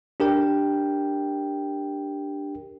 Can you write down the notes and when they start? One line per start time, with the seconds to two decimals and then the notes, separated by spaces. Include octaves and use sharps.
0.20 D4 G4 A#4 G5